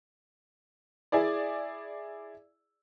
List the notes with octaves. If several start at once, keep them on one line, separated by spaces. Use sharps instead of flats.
E4 G#4 D5